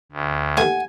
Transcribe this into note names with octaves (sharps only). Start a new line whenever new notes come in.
D2
D#2 A2 F#5 G#5